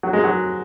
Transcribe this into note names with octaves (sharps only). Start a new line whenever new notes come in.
F#3
G#3
F#3